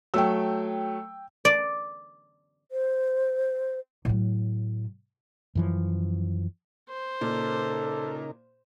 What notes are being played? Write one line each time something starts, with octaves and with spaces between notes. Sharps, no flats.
F#3 A3 G5 E6
D5
C5
A2 F#3
F#2 E3 F3
C5
A#2 C#3 D#4 A4 A#4